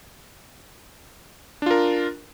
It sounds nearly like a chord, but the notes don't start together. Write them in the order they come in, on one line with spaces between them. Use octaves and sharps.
D4 F4 A#4